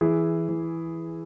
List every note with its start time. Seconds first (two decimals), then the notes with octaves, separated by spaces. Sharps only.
0.01 E3 E4 G#4
0.49 E3